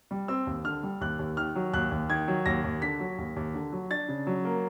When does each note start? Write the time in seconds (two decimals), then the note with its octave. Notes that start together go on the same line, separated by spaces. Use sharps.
0.11 G3
0.28 C4 E6
0.47 D#2
0.65 D3 F6
0.83 G3
1.01 D#2 F#6
1.19 D#2
1.37 D#3 F6
1.56 F#3
1.73 D#2 F#6
1.91 D#2
2.09 D#3 G#6
2.28 F#3
2.46 D#2 A#6
2.64 D#2
2.82 D3 B6
3.00 F#3
3.18 D#2
3.36 D#2
3.54 D3
3.72 F#3
3.91 D4 A6
4.09 C#3
4.27 F#3
4.45 A#3